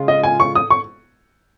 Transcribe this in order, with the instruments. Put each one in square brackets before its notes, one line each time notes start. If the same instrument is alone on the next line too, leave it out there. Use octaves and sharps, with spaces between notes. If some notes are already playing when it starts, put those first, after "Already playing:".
Already playing: [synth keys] C#3 G#3 F4
[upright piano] D#5
G#5
C#6
D#6
C#6